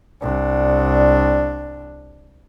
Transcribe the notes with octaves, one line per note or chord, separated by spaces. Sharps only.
C2 D4